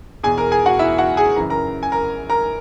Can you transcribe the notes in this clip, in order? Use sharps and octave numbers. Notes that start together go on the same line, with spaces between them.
E2 B2 G#4 G#5
A#4 A#5
G#4 G#5
F#4 F#5
E4 E5
F#4 F#5
G#4 G#5
F#2 C#3 E3 A#5
A#4 A#5
G#5
A#4 A#5
A#4 A#5